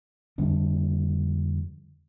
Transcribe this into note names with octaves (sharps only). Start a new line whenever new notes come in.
F2 D3 G3 D4